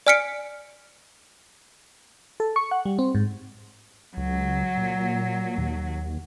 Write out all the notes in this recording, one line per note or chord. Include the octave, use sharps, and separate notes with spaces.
D5 G#5 F6 B6 C#7 D7
A4
C#6
F#5
G3
C4
G#2
C#2 F#3
A#2
D#2